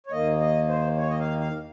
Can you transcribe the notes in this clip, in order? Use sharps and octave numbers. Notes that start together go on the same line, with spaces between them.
C#5
D#2 D#3 A#3 D#5
D#5
C5
C#5
D#5
F5
F5